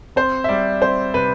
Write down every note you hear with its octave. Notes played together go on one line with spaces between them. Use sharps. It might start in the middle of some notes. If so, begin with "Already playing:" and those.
C4 C5
E5
G3 D5
C4 C5
C3 B4